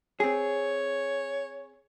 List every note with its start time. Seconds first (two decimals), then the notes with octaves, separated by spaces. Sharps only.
0.20 C4 G#4 C#5